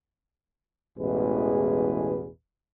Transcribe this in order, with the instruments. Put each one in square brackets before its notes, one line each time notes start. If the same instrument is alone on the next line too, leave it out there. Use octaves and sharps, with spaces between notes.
[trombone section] A1 E2 B2 G#3 G#4 B4